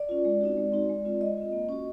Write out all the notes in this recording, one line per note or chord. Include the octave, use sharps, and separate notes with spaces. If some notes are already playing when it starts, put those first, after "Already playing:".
Already playing: D5
C#4 F4
G#3
C4 D#4 F#4
G#3
C4 D#4 F#4
G#3
C4 F4
G#3 D#5
C4 F4
A#3
C#4 F#4